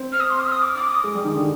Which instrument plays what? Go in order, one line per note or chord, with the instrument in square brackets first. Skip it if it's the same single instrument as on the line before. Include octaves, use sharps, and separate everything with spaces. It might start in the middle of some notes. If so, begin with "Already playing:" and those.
Already playing: [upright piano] C4
[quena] F6
D#6
C6
D#6
F6
D#6
D6
D6
D#6
[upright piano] G#3
G3
D#3
D3